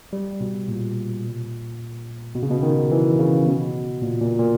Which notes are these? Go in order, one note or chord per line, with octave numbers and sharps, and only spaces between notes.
G3
B2
A#2
B2
C#3
B2
D#3
E3
C#3
B2
A#2
A#2
A#2